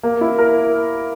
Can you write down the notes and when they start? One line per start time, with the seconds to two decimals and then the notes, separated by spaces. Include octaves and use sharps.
0.03 A#3
0.21 E4
0.38 A#4